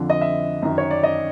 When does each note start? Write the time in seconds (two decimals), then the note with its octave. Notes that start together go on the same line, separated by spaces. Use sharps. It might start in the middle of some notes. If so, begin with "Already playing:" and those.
Already playing: F2 D3 F3
0.10 D#5
0.21 E5
0.63 F#2 D#3
0.78 C#5
0.91 D5
1.03 D#5